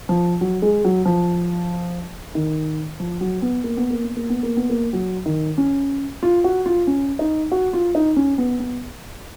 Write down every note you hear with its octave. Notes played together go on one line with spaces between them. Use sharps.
F3
F#3
G#3
F#3
F3
D#3
F3
F#3
B3
A#3
B3
A#3
B3
A#3
B3
A#3
B3
A#3
F#3
D#3
C#4
F4
F#4
F4
C#4
D#4
F#4
F4
D#4
C#4
B3
B3